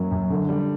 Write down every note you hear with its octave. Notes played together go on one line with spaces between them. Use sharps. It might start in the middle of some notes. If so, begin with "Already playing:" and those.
Already playing: F#2 F#3 A#3
F#2
D3
G3